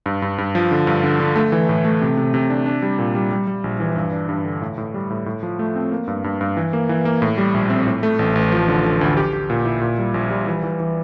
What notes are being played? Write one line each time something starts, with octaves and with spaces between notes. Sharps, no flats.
G2
G2
G2
F3
D3
G2
D3
D3
A3
E3
A2
A3
C3
C3
C3
D4
D4
G3
A#2
G3
G3
G3
A#1
E3
G2
D4
G2
D3
A2
A2
G3
A2
A2
F3
A3
C4
A#3
G2
G2
G2
E3
A#3
E3
A#3
A2
G3
A#1
C4
A2
A3
A1
A1
F3
D3
D3
D2
G4
G4
A#2
E4
A#2
G3
A#1
G3
E3
E3
E3